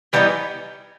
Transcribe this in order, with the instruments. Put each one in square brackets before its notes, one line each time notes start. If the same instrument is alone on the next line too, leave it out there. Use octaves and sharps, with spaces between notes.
[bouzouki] E3 G3 B3 D#4